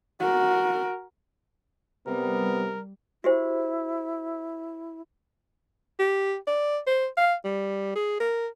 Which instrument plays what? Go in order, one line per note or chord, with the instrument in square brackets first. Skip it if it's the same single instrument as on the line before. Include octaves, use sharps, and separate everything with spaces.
[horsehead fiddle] F#4 A#4
[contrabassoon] C3 [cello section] G3 [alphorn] B3 [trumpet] A#4
[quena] E4 [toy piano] F#4 G4 C5
[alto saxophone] G4
D5
C5
F5
G3
G#4
A#4